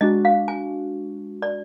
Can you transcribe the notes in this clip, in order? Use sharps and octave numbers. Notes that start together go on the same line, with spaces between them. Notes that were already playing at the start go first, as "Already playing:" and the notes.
G#3 D4 F#4 D#5
F5
G#5
D5